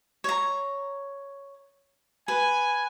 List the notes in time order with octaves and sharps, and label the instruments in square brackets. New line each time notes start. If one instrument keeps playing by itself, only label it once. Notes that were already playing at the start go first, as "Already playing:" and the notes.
[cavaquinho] C#5 A#5
[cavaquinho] B4 [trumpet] G#5